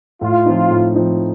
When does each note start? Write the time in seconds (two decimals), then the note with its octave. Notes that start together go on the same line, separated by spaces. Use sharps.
0.21 A2 F4
0.46 F3 C4 D#4
0.71 A2
0.96 F3 C4 D#4